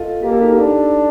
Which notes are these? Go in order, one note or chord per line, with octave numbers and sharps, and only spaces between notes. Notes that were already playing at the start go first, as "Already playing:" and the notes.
Already playing: F4 A4 D#5
A#3 G4
A4
D#4 G4
D4